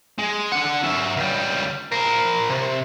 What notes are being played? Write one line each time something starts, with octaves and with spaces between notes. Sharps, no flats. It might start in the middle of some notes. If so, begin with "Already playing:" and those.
G#3
D4 F#5
F#3 E5
C#2 G3
A#4 C5
C3